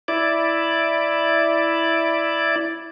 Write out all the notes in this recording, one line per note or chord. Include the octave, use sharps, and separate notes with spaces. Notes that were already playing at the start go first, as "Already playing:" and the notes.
E4 D5